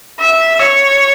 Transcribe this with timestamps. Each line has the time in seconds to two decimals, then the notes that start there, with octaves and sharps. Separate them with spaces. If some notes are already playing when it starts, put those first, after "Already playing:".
0.19 E5
0.59 C#5